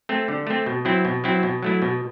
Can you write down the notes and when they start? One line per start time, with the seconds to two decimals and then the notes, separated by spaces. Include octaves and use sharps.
0.09 A3 C4
0.28 D3
0.47 A3 C4
0.66 B2
0.85 F#3 C4 E4
1.05 B2
1.24 F#3 C4 E4
1.43 B2
1.63 F#3 A3 E4
1.82 B2